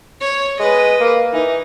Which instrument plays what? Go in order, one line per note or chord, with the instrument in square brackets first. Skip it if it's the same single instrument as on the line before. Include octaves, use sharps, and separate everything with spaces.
[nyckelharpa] C#5
[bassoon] G#3 [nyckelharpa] B4 D#5
[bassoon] A#3
[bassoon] E3 [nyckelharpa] D#4